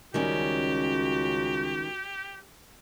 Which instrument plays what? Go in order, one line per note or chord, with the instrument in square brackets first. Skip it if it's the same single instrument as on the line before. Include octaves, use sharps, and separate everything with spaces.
[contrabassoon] C#2 [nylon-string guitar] D#3 G3 C#4 [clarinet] F#4 [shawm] G4